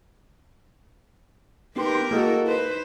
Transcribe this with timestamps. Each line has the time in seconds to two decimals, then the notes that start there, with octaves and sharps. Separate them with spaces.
1.76 A3 B3 D#4 G4 A#4 B4 C6
2.11 G#3 A#3 E4 F#4 A4
2.47 D#4 B4 C5